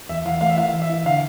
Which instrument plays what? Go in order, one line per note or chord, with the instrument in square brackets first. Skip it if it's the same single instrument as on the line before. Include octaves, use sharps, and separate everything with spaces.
[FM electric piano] E2 [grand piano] E5
[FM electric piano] E3 [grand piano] F5
[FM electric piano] A3 [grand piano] F5
[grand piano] E5
[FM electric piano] E4 [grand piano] F5
[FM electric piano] E3
[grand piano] E5
[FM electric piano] E4
[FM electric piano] D3 [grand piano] F5